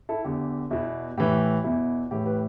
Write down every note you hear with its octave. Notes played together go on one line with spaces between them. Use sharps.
E4 A4
E2 D3 G4
E2 B2 E4
A2 E3 G4
E2 B2 E4
A2 E3 G4
G4 B4